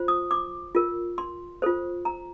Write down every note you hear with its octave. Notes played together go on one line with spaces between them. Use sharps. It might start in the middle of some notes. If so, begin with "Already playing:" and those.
Already playing: F4 C5
D#6
D6
F4 A#4
C6
F4 A4 C5
A#5